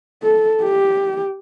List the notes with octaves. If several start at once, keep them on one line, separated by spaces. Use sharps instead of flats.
A4
G4